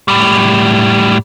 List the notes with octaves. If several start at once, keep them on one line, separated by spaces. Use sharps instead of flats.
A2 G3